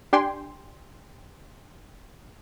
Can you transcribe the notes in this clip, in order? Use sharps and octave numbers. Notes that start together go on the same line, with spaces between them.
D4 G4 G5 G#5 C6